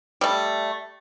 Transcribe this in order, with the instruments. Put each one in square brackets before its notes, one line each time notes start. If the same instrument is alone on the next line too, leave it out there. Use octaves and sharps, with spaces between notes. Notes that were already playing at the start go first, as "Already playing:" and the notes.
[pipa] G3 A3